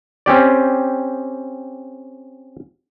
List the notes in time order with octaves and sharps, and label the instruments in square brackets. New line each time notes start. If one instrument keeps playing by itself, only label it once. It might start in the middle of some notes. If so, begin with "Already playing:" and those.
[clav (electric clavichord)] C4 C#4 G4 D5